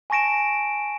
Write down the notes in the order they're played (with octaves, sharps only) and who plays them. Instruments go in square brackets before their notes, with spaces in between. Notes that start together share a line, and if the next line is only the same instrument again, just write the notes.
[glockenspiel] G#5 A5 C#6 A#6 D7 E7